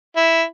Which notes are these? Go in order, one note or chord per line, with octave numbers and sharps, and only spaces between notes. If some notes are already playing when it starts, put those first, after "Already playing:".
E4